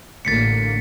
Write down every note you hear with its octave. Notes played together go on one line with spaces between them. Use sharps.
A1 D3 A#3 A6 B6 C#7